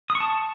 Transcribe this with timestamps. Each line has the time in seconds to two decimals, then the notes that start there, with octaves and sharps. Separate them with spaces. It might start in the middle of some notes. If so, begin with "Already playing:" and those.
0.10 D#6
0.15 C#6
0.20 A5